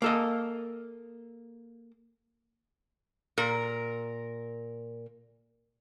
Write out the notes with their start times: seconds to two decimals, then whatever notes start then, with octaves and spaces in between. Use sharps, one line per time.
0.02 A#3 A4 D#5
3.38 A#2 A#4